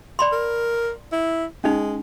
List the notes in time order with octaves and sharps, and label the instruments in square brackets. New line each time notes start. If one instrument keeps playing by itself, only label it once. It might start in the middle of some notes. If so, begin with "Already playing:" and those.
[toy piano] D5 B5 C6
[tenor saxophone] A#4
E4
[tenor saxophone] G#3 [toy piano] C#4 D#4